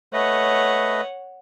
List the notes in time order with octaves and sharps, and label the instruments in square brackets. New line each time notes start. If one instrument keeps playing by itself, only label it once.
[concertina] A3 B4 D#5 [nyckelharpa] C#5 F#5